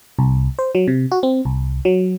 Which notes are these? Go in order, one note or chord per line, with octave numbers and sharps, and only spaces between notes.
C2
C5
F#3
C3
F#4
C4
C2
F#3